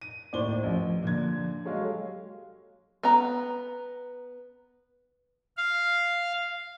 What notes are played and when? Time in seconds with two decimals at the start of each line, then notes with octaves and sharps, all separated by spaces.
0.01 D#7
0.33 D#2 A2 C5 D5 G7
0.63 A1 F3
1.03 A#2 D3 G#6
1.66 F#3 G#3 G4 A4 C#5 F5
3.03 B3 A#5
5.57 F5